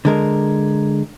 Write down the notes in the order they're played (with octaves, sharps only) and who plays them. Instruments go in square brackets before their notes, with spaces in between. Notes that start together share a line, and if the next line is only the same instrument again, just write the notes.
[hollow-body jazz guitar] D3 G#3 A#4